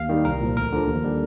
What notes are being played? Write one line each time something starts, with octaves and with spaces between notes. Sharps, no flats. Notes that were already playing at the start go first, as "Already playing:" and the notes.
Already playing: D#2 F5
D#3 G3
C2 A#4
A#2 F3
D2 A#4
D3 F3
D#2
D3 G3